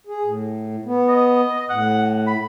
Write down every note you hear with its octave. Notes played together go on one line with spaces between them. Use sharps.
G#4
A2
B3
D#5
A2 F#5
B5